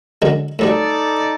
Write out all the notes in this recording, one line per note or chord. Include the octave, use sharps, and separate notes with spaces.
D3 F#3 G#3
A2 F#3 G3 D#4 A4 D5